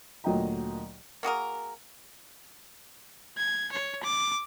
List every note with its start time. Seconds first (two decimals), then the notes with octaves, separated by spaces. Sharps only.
0.24 D2 A#2 F#3 D#5 G5 A#5
1.23 A#3 F#4 G#4 A#4
3.38 G#6
3.72 C#5
4.03 D6